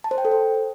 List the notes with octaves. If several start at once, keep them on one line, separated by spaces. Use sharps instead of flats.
A5
C5
G5
A4
C5